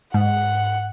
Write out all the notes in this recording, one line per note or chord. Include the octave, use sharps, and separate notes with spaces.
G#2 F#5